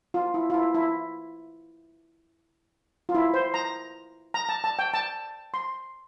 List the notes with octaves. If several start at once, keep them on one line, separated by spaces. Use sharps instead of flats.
F4
E4
F4
E4
E4
F4
E4
C5
A#5
A#5
A5
A5
G5
A5
C6